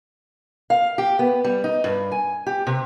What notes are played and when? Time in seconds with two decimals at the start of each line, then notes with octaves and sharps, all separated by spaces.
0.70 F5
0.98 G4
1.19 B3
1.44 G3
1.64 D#4
1.84 G2
2.11 G#5
2.46 G4
2.67 C3